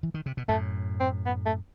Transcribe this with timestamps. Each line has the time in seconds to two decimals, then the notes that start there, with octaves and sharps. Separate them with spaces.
0.03 E3
0.14 D#3
0.26 C3
0.37 B2
0.48 F#2 A2 A3
1.00 C4
1.26 B3
1.46 A3